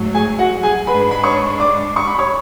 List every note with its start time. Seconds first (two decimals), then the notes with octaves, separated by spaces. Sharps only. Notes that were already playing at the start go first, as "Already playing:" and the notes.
Already playing: G#2 F#3 A3
0.15 G#4 G#5
0.39 F#4 F#5
0.63 G#4 G#5
0.87 G#2 G#3 D4 B4 B5
1.11 B5
1.23 C#5 C#6
1.60 D5 D6
1.96 C#6
2.07 B5
2.18 C#5 C#6